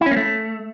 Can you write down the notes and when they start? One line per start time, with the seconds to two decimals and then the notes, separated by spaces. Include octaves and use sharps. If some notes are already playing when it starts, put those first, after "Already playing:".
0.01 E4
0.06 C#4
0.11 A#3
0.16 A3